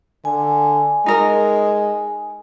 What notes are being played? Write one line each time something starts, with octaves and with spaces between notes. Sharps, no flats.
D3 G#5
G#3 D#4 A#4